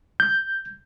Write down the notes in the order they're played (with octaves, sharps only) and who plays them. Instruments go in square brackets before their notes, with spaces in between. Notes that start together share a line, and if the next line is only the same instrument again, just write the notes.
[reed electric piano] G6